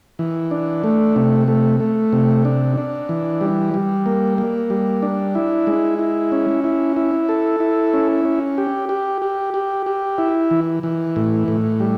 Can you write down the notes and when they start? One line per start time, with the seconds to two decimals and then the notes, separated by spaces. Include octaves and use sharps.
0.19 E3
0.51 D4
0.84 A3
1.16 C3
1.48 A3
1.80 A3
2.13 C3
2.45 D4
2.77 D4
3.09 E3
3.41 G3
3.74 G3
4.06 A#3
4.38 A#3
4.70 G3
5.02 D4
5.35 E4
5.67 G#3
5.99 E4
6.32 C#4
6.64 E4
6.96 E4
7.29 A4
7.60 E4
7.93 C#4
8.25 C#4
8.58 G4
8.89 G4
9.22 G4
9.54 G4
9.86 G4
10.18 E4
10.51 E3
10.83 E3
11.16 A2
11.48 A2
11.80 G3